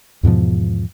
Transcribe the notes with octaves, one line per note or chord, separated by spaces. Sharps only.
E2 G#2 B2 F3